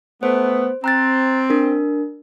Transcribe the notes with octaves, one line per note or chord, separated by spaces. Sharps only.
A3 B3 C5
C4 A#5 F#6 A6
D4 A#4